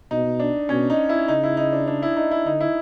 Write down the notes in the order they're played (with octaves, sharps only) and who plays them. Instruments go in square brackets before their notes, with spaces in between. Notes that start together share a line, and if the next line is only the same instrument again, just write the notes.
[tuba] B2 [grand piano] D#4
[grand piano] D4
[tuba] B2 [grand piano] C#4
[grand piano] D#4
E4
[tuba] C#3 [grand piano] D#4
[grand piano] E4
D#4
D4
D4
E4
D#4
E4
[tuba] D3 [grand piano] D#4
[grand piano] E4